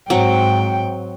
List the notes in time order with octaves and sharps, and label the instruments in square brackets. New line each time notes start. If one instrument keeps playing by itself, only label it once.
[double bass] G#2 [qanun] F#3 C4 [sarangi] G5